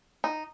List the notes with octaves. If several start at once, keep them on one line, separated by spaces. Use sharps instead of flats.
D#4